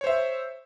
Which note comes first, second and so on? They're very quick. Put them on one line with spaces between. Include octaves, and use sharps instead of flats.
C#5 C5 E5